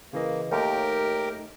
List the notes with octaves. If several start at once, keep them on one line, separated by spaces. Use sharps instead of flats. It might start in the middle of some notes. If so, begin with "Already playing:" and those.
C#3 E3 A#3 D#5
D#2 A3 D#4 G4 A#4